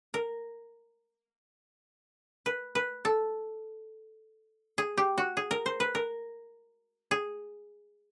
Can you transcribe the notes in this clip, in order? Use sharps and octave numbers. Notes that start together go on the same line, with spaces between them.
A#4
B4
B4
A4
G#4
G4
F#4
G#4
A#4
C5
B4
A#4
G#4